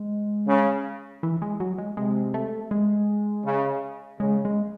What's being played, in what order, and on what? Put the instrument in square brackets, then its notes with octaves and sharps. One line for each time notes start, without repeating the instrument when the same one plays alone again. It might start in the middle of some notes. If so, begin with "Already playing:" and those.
Already playing: [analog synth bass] G#3
[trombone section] C#3
[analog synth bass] E3
G#3
F#3
G#3
[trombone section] C3 [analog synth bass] G#3
[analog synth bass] A3
G#3
[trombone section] C#3
[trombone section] C#3 [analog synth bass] G#3
[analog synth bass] G#3